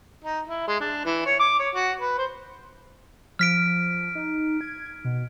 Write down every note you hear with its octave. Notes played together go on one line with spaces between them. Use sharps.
D#4
E4
G#3
D4
E3
C#5
D6
C#5
F#4
B4
C5
F3 F6 B6 D7
D#4
G#6
B2